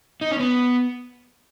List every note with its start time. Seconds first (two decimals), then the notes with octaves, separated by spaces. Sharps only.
0.21 D#4
0.31 C#4
0.40 B3